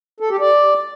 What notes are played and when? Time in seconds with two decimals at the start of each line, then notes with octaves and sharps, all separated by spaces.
0.20 A4
0.30 G4
0.40 D5